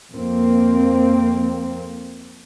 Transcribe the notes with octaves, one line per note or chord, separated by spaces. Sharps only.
F2 A#3 C4